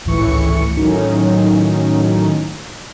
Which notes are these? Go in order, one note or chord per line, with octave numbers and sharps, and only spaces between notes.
G#1 C#2 A2 E3 C#6 C#7
A2 D#3 F#3 C#4 D#4